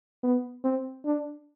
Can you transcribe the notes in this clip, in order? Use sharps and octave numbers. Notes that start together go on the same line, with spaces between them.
B3
C4
D4